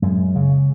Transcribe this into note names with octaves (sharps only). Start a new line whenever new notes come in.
F#2 G#3
C#3